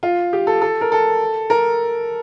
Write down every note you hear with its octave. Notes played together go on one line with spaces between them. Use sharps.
F4
G4
A4
A4
A#4
A4
A#4